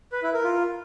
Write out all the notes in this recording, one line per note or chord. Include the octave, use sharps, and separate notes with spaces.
B4
E4
A#4
F4